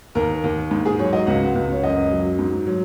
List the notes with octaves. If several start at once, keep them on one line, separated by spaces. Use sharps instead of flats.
D#2 A#4
D#2
G#2
G#4
F#3 C#5
D#5
C#2 F#5
C#2
C#5
F#2 D#5
F#3
G#2
F#3